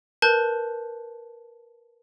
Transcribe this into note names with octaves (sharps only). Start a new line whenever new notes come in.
A#4 B4 A5 F#6 G6